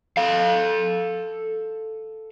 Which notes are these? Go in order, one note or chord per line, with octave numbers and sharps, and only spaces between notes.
A4 F5